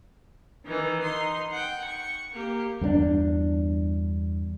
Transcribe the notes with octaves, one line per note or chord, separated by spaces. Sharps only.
D#3 E3
D#4 C6
F#5 G5
C#6
A#3 G4
E2 G2 A#3 D4